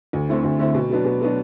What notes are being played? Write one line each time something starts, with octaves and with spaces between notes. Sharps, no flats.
D2
D3 A3 C4 E4
D2
D3 A3 C4 E4
B2
F#3 B3 D4
B2
F#3 B3 D4